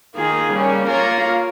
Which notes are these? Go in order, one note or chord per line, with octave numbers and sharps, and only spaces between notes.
D#3 A#3 F4 G#4
C#3 G3 A#3 C#4
A#3 F4 A#4 C#5